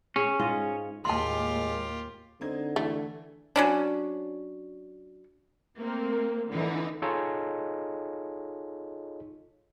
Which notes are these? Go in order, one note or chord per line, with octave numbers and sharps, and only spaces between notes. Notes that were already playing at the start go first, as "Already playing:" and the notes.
C#4 G#4
G#2 F4 D#5
D#2 A2 G#3 A#3 F4 G4 A5 C6
D3 C4 D#4 G#6
E3 A3
F#3 C#4 D4
A3 A#3 C4
D3 E3 D#4
D#4 F4 G#4 A4 C#5 D#5